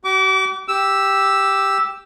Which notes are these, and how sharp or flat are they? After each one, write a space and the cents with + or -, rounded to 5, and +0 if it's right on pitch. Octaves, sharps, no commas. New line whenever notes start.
F#4 +45 D6 -30
G4 +0 E6 +0